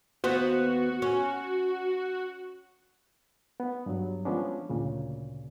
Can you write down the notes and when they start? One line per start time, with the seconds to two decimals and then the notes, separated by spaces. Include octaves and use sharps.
0.24 D#2 B3 F#4 C5
1.02 C#4
3.60 B3
3.86 G2 F#3
4.25 F3 G#3 B3 C#4 D4
4.70 D2 A#2 C#3